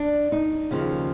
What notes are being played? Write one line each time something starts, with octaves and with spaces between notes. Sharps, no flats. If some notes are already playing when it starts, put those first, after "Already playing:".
Already playing: D4
D#4
D#2 C#3 F3